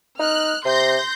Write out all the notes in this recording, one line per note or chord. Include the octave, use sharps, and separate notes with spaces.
D#4 F6 F#6
C3 C6 G6 A#6